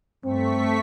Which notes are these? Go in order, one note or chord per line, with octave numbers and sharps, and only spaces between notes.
G2 A3 C4 C#6 B6